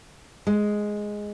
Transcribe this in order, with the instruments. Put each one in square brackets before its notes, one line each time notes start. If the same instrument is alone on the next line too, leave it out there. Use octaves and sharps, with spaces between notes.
[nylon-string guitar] G#3